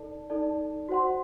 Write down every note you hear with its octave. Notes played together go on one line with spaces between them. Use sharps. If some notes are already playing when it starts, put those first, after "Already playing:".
Already playing: D#4 A4 D5 A5
D#4 A4 D5 A5
F#4 C5 F#5 C6